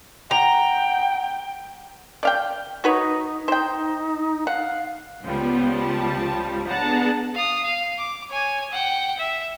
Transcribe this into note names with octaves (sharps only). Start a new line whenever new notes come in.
F#5 G5 A#5
D5 F5 G5
D#4 F#4 B4 C#5
D#4 C5 G5
F5 F#5
C#2 F3 G3 B3
A5
B3 D4 G#4 F#5 A5 A#5
F5 D#6
F5
D6
C#5 G#5
F#5 G5
E5